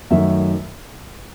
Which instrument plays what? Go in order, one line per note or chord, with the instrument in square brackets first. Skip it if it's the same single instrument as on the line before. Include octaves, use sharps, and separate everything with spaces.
[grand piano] F#2 D#3 F#3 A3 E5